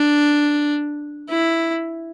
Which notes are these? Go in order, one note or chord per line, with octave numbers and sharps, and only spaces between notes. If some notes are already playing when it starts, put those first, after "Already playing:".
Already playing: D4
E4